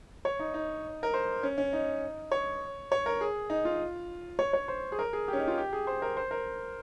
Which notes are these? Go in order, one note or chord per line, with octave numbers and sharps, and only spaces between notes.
C#5
D#4
D#4
A#4
C5
C#4
C#4
D#4
C#5
C#5
A#4
G#4
D#4
F4
C#5
C#5
C5
G#4
A#4
G#4
G4
C#4
D#4
F4
G4
G#4
C5
A#4
C5
A#4